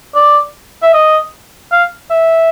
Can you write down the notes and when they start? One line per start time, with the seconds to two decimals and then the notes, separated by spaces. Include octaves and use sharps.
0.15 D5
0.82 E5
0.94 D#5
1.72 F5
2.10 E5